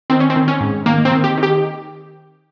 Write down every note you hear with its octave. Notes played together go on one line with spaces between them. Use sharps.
D#3 C4
C#4
C4
D#3
C#4
G#2
D#3 A#3
C4
D#3
G4
D#3
G4